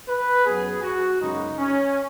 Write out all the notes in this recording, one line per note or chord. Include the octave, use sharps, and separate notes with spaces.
B4
F#2 F#3 B3 G#4
F#4
F#2 C#3 G#3 B3 D#4
C#4